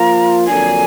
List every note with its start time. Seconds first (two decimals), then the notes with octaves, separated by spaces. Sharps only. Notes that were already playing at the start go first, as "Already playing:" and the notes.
Already playing: F3 A#3 F4 A#5
0.47 F2 D3 F#3 A#3 D4 G#5